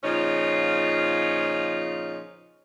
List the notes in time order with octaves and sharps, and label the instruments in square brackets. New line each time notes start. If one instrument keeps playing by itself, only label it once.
[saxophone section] A#2 C#3 F3 C#4 D#4 F4